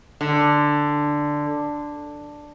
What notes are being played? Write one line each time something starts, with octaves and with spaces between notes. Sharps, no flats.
D3